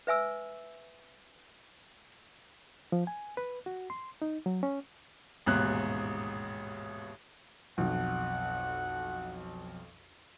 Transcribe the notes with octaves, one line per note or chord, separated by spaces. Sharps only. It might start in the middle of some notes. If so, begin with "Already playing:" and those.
B4 E5 G#5 E6
F3
G#5
B4
F#4
C6
D#4
F#3
C#4
A1 D#2 G#2 B2 F#6
B1 F2 F#5